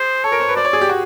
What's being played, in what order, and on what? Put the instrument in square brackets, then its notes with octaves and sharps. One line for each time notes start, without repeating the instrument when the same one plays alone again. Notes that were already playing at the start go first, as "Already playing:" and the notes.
Already playing: [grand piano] G#4 [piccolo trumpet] C5
[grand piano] A4 [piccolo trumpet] C#5
[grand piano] A#4
C5
B4
[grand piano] C5 [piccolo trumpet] D5
[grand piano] C#5
G#4
G4
F#4